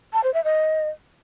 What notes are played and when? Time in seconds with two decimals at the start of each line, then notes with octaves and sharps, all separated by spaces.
0.13 A5
0.23 C5
0.34 E5
0.44 D#5